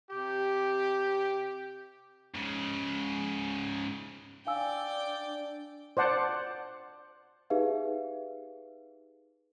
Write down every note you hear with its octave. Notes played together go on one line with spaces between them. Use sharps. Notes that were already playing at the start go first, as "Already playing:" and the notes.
C3 G4
G#2 C#3
D4 D5 F5 G5 G#5 E6
C5 D5 F#5 A5
D#4 G4 G#4 B4 E5 F5